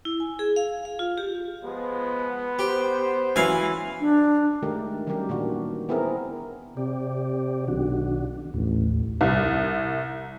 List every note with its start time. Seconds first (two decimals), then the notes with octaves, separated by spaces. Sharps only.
0.05 E4
0.20 G#5
0.39 G#4
0.56 F5
0.85 F5
0.99 F4
1.18 G4
1.64 F3 G#3 B3
2.59 G4 C5
3.36 E3 F#3 F5 G#5 B5
4.01 D4
4.63 D#3 G#3 A3 G4 A#4
5.07 D#3 F#3 G3 C#4 G4 A#4
5.29 A#2 D#3 E3 D4 F#4
5.89 B3 C4 E4 G#4 A#4
6.77 C3 G4 D5
7.68 B1 D#3 D4 F#4
8.54 A1 D#2 A2
9.21 C2